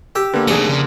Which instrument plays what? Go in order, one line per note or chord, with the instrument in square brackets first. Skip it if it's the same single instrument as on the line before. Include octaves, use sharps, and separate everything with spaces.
[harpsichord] G4 [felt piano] E6
[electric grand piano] D3 A#3 [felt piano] B3
[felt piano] F1 D#2 G#4 [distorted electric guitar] A3 C4 [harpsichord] A#5
[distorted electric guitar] C#3